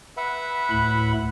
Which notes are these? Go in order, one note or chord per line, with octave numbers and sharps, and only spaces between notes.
B4 E5 F#5
D2 A2 B5